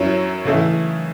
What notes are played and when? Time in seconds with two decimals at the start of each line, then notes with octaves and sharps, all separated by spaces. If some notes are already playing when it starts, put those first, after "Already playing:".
Already playing: F#2 F#3 C#4 E4 C#5
0.45 C#3 E3 A3 E4